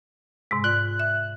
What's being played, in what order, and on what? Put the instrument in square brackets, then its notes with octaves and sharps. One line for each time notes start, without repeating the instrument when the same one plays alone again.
[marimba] G#2 C3 G#3
[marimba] F4 D5 [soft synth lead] F#6
[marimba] E5